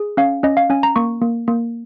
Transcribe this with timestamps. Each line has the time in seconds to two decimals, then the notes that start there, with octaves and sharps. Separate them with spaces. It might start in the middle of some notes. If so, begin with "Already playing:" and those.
Already playing: G#4
0.17 C#4 F5
0.43 C#4 D#5
0.57 F5
0.70 C#4 G#5
0.83 A#5
0.96 A#3 C#6
1.22 A#3
1.48 A#3